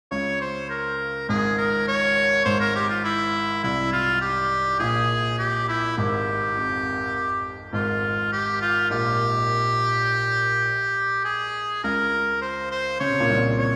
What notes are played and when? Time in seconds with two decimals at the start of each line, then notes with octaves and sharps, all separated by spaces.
0.11 C#2 C#3 C#5
0.41 C5
0.70 A#4
1.29 G#1 G#2 G#4
1.58 A#4
1.88 C#5
2.45 G#1 G#2 C5
2.60 A#4
2.76 G4
2.89 F4
3.04 E4
3.63 C2 C3 E4
3.93 F4
4.21 G4
4.80 A#1 A#2 G#4
5.39 G4
5.68 E4
5.98 G#1 G#2 G4
6.56 F2
7.73 G#1 G#2 F4
8.32 G4
8.61 F4
8.90 A#1 A#2 G4
11.25 G#4
11.84 C#2 C#3 A#4
12.42 C5
12.71 C5
13.00 C#3 C#5
13.10 C3
13.20 A#2
13.30 C2 C3
13.59 C#5